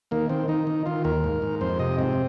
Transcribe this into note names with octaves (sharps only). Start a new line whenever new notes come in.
D#3 A#3
D#3 C4
D#3 D#4
D#3
D#3 F4
D#2 A#4
G#2
G#2
F2 C5
C3 D#5
G#2 C4